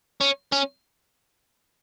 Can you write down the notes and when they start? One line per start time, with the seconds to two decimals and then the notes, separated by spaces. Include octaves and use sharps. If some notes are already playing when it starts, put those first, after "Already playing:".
0.21 C#4
0.52 C#4